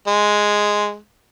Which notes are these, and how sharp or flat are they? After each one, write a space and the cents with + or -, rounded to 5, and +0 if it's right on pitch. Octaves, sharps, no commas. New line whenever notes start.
G#3 +0